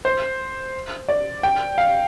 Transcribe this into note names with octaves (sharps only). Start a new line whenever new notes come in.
C5
D5
G5
F5